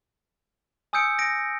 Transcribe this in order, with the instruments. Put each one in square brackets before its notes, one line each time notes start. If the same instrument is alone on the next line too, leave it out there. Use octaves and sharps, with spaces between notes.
[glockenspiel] G#5 D#6 E6 G6 C#7 D7
A#6 D7